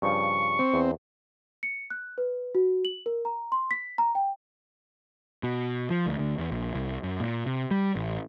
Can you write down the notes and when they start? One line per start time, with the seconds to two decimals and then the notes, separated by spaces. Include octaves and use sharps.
0.02 G2 C#3 F3 C#6
0.59 C4
0.74 E2
1.63 C#7
1.90 F#6
2.18 B4
2.55 F#4
2.85 F#7
3.06 A#4
3.25 A#5
3.52 C6
3.71 B6
3.98 A#5
4.15 G5
5.43 B2
5.90 F3
6.06 D2
6.19 D2
6.38 E2
6.51 A#1
6.75 C2
7.03 F#2
7.20 A#2
7.46 C3
7.71 G3
7.96 A1